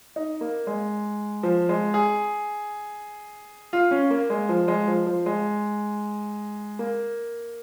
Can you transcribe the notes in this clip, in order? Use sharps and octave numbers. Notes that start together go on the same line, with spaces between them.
D#4
A#3
G#3
F3
G#3
G#4
F4
C#4
A#3
G#3
F3
G#3
F3
F3
G#3
A#3